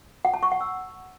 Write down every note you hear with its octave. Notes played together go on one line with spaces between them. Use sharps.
F#5
A5
C#6
F#5
E6